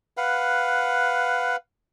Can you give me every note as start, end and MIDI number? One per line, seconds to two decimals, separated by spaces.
0.17 1.56 71
0.17 1.56 77
0.17 1.56 78